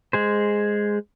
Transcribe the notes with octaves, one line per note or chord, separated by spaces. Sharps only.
G#3 G#4 C5